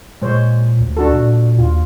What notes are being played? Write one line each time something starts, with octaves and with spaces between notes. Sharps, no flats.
A#2 G#3 C5 C#5
D2
D4 F#4 A4
A#2
D#2 F4